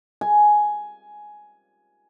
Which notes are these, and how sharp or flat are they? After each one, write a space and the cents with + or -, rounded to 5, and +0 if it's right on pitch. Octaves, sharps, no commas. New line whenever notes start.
G#5 +10